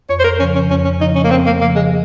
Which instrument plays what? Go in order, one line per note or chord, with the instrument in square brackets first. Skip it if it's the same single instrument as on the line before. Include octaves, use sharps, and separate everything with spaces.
[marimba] F2 [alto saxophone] C#5
[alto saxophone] C5
A#4
[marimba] C#3 F3 [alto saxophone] C#4
[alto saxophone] C#4
[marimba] F2 [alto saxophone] C#4
[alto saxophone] C#4
[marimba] C#3 F3 [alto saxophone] D#4
[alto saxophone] C#4
A#3
[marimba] F2 [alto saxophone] C4
[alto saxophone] A#3
[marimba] C#3 F3 [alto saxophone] A#3
[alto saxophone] G#3